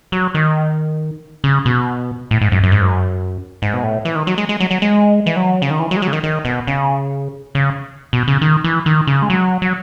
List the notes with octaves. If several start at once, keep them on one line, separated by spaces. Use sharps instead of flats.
F#3
D#3
C#3
B2
A2
G#2
F#2
F#2
G#2
F#2
G#2
B2
A2
E3
D#3
F#3
G#3
G#3
F#3
F#3
G#3
E3
F#3
C#3
D#3
E3
F#3
G#3
F#3
C#3
D#3
D#3
B2
C#3
C#3
B2
C#3
D#3
E3
D#3
C#3
G#3
F#3
F#3